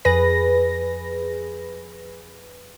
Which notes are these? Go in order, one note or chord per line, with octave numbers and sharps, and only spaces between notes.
F2 G#4 B4 A#6